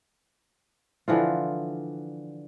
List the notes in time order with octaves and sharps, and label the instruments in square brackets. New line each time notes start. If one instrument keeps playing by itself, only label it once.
[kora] D3 E3 F3 F4